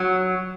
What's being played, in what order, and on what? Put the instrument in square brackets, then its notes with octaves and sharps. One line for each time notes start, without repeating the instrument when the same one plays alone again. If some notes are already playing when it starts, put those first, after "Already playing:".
Already playing: [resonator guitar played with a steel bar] F#3